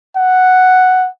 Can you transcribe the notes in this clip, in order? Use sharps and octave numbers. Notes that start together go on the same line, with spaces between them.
F#5